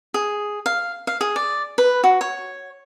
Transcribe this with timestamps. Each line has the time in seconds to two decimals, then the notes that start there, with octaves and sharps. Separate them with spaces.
0.14 G#4
0.66 F5
1.07 F5
1.21 G#4
1.36 D5
1.78 B4
2.04 F#4
2.21 C#5